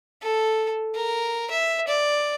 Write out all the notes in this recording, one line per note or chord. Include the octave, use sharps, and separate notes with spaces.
A4
A#4
E5
D5